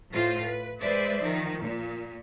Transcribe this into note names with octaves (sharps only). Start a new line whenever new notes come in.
A2 F4 C5
B4
G#3 B4 C5 D5 E5
D#3 F3
A#2